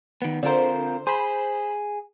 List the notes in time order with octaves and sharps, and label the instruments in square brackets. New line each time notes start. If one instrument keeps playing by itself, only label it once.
[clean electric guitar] D#3 B3
[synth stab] D3 C5 [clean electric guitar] C4 F4 A#4
[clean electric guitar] G#4 [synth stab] C5 B5